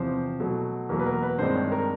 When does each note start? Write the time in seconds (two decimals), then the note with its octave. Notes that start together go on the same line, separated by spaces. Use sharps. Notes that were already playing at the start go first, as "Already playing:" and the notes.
Already playing: E2 C3 F3 C5
0.40 B2 F#3 A3
0.89 E2 B2 F#3 A#3 A#4
0.99 B4
1.06 A#4
1.23 B4
1.39 G2 D#3 G#3 C4 C5
1.56 C#5
1.72 A#4